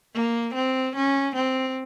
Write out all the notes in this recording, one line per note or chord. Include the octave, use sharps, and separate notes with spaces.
A#3
C4
C#4
C4